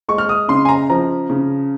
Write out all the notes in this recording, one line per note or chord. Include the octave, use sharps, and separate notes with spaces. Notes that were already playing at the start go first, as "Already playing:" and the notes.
G#3 C#6
F6
D#6
C#3 C6
G#5
A#5
F3 A#5
C#3